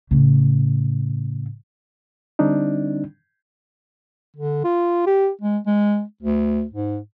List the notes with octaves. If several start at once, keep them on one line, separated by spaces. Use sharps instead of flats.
A2 C#3
D3 G3 C4 D4 D#4
D3
F4
G4
G#3
G#3
D2
G#2